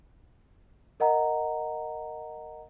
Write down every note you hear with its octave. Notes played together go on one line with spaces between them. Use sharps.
A#4 D#5 F#5 A#5